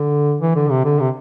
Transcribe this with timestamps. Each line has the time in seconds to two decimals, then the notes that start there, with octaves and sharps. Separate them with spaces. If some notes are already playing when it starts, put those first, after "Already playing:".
Already playing: D3
0.41 E3
0.55 D3
0.70 C3
0.84 D3
1.00 C3